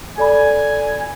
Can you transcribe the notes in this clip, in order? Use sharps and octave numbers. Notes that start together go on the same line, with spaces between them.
A4 D5 G#5 B5